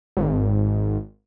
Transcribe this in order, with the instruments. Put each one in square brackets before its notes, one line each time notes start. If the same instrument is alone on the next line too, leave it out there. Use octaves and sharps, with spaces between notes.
[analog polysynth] G#1